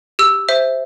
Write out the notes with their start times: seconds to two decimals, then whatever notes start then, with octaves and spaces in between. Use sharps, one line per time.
0.19 G4 E6
0.49 C5 E5